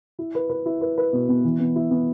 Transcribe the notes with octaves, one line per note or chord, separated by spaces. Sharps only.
E4
B4
B4
E4
B4
B4
B2
B3
E3
B3
E4
B3